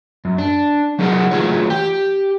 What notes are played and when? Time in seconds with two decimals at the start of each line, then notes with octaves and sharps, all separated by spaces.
0.25 F#2
0.38 D4
0.99 F#3 D#4 G#4 A#4 D#5 F#5
1.31 E3 F#3 A3 F4 G#4 C#5
1.70 G4 G5